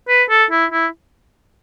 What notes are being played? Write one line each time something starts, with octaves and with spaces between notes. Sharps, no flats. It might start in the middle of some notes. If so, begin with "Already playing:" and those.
B4
A4
E4
E4